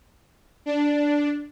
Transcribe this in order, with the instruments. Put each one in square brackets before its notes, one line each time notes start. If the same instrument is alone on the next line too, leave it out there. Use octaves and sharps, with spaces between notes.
[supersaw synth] D4